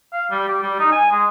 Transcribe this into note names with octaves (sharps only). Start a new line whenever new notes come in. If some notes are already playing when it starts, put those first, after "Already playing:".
F5
G3
G4
G3
D#4
G#5
G#3